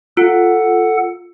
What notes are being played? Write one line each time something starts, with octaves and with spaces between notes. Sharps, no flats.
F4 A4 F#5